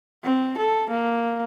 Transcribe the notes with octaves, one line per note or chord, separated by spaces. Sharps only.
C4
A4
A#3